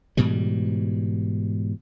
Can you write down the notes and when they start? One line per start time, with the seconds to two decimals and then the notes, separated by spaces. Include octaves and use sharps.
0.17 G#2 B2 E3 G3